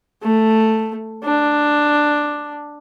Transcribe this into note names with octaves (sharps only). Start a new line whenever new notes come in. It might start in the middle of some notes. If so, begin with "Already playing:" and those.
A3
D4